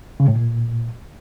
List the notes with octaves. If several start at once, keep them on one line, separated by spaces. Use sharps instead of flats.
C#3
A2
A#2